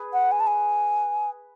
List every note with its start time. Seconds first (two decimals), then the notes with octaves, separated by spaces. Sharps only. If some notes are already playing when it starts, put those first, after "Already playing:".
Already playing: G#4 B4
0.13 F#5
0.32 G#5
0.40 A5
0.47 G#5